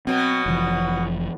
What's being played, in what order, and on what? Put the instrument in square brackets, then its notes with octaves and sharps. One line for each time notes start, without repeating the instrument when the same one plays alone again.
[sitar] B2 F#3 B3 [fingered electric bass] C4
[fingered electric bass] F1 E3 F3